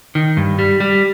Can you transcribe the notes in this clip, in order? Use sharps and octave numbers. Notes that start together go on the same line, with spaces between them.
D#3
G2
G3
G3